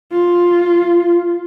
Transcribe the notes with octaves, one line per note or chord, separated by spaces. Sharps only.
F4